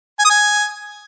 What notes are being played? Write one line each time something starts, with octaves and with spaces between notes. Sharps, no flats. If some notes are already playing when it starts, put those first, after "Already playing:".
G#5
D#6
G#5